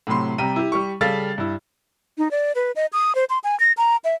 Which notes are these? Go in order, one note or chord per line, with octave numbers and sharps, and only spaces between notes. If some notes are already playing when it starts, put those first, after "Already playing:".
A2 C3 F#3 B5 C6
C3 G3 G5 A#5 D#7
E4 G4
G3 G4 C#6
C#3 G3 A4 F5 A6
G2 E4
D#4
D5
B4
D#5
D#6
C5
C6
G#5
A#6
A#5
E5